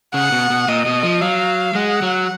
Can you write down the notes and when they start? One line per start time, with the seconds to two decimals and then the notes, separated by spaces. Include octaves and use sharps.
0.14 C#3 F#5
0.32 B2
0.50 B2
0.68 A#2 D#5
0.86 B2
1.03 F3
1.21 F#3 F5
1.75 G#3 F#5
2.02 F#3